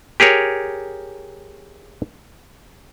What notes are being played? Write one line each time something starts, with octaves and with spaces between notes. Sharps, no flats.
G4 G#4 A#4 C#5